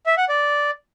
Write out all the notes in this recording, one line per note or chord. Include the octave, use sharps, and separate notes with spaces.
E5
F#5
D5